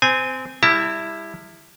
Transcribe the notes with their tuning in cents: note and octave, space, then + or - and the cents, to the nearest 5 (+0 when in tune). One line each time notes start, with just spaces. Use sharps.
C4 -20 G#5 -5
G3 +30 E4 +0 A5 +45